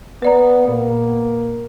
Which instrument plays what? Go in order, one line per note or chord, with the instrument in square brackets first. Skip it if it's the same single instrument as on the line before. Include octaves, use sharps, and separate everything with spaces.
[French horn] B3 [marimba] B4 D5 A#5
[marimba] A#2 [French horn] A#3